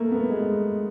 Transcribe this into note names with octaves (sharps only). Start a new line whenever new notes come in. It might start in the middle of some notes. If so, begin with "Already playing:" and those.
Already playing: A3 A#3
B3
G#3